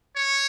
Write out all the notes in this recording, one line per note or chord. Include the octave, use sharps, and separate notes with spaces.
C#5